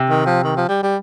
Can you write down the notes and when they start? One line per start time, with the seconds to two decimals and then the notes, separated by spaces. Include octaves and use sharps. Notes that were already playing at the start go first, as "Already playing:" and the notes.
Already playing: C3
0.10 D#3
0.26 F3
0.44 D#3
0.57 F3
0.69 G3
0.83 G3